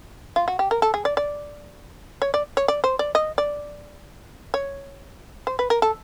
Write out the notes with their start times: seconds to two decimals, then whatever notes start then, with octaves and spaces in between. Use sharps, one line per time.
0.36 F4
0.48 F#4
0.59 G4
0.71 A#4
0.82 A4
0.94 G#4
1.05 D5
1.17 D5
2.22 C#5
2.34 D5
2.57 C#5
2.68 D5
2.84 C5
2.99 D5
3.15 D#5
3.38 D5
4.54 C#5
5.47 C5
5.59 B4
5.70 A#4
5.82 A4